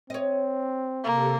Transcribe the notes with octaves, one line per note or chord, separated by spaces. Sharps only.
C4 C#5 D#5
C3 A#3 G4 A4